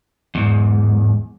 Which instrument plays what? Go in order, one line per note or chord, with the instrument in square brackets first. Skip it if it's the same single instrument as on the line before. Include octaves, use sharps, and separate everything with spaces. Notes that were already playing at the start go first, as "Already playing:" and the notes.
[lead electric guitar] E2 G#2